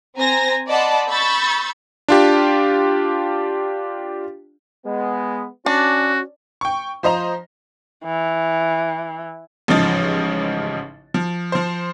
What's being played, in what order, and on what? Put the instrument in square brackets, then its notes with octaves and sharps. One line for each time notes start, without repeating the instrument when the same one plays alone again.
[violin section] C4 C5 G#5 A#5 A#6
D5 D#5 F#5 A5 B5 C6
B5 C#6 E6 G6 A6
[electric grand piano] D4 F4 G4
[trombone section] G#3 B3
[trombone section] C#4 [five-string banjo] D4 [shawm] F#4
[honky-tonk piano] G5 C#6
F3 C5 D#5 A#5
[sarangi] E3
[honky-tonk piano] A1 G#2 C#3 F3 D#5 A6
F3
F3 C5